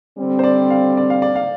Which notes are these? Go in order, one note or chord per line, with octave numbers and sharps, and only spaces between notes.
D3 G3 C4
C5
D5
F5
D5
F5
D5
F5